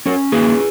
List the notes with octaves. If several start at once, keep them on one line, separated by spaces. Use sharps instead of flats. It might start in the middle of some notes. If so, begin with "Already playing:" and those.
C#4 A#4 C#5
A#3 G#4 B4